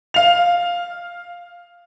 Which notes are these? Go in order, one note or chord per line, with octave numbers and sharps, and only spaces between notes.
F5 F7